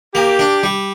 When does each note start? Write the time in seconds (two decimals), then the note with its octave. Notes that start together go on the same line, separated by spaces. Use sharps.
0.15 A#3 G4
0.39 D4
0.63 G3